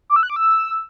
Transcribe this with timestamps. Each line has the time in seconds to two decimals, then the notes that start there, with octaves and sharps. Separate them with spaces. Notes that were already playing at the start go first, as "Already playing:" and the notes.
0.10 D6
0.16 E6
0.23 F#6
0.30 D6
0.36 E6